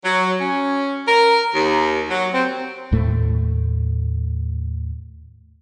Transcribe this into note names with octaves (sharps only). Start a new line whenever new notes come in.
F#3
C#4
A#4
D#2
F#3
C4
D#2 A2 A3